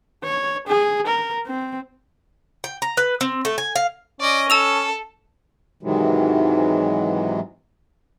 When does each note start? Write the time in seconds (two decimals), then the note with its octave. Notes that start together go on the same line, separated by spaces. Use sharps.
0.24 C#5
0.68 G#4
1.07 A#4
1.47 C4
2.64 G5
2.82 A#5
2.97 B4
3.21 C4
3.45 A3
3.58 G#5
3.76 F5
4.21 C#4 D5 D#5
4.50 A4 A5 E6 F7
5.83 G#2 C3 D#3 E3 F#3 G#3